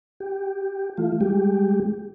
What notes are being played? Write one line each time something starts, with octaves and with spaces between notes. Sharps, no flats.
G4
E3 A3 F4
G3 G#3 G4